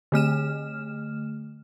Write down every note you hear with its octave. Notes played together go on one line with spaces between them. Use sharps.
D3 A3 F6 E7